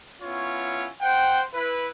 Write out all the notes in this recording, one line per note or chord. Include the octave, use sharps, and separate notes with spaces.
B3 C#4 E4 F4 C#5
C5 F#5 G5
E4 B4